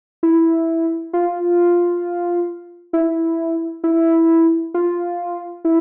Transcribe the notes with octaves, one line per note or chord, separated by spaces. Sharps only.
E4
F4
E4
E4
F4
E4